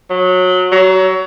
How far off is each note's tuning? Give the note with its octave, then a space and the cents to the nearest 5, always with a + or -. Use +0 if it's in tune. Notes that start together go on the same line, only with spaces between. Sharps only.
F#3 -20
F#3 +25